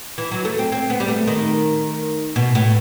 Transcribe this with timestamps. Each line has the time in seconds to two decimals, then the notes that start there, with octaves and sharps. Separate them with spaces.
0.18 E3
0.31 F#3
0.45 A3
0.59 C4
0.72 C4
0.90 B3
1.00 G3
1.08 A3
1.27 D#3
2.36 B2
2.55 A2